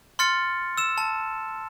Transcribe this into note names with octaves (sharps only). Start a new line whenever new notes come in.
C6 F6 A6 C#7
E6 E7
A5